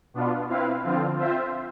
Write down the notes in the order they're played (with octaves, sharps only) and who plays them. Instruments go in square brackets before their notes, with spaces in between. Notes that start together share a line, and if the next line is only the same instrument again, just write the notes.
[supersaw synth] B2 B3 D4 F4
C4 E4 B4 F5
D3 F3 C4 F4
C4 F4 C5 E5